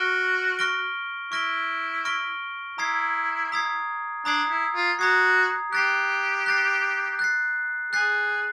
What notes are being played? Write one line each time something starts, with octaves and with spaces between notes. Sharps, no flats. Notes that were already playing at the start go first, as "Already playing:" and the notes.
Already playing: F#4 C#6 F6 A#6 D7 G7
C#6 F6 A#6 D7 G7
E4 C#6 F6 A#6 D7 G7
C#6 F6 A#6 D7 G7
E4 A#5 D#6 G#6 C7
A#5 D#6 G#6 C7
D4 A#5 D#6 G#6 C7
E4
F4
F#4 A#5 D#6 G#6 C7
G4 F#6 A6 C7
F#6 A6 C7
F#6 A6 C7
G#4 F#6 A6 C7